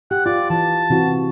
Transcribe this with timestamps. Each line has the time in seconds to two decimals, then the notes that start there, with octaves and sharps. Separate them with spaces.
0.11 G4 F#5
0.26 F4 D5
0.50 E3 A5
0.90 C3 E3 F#4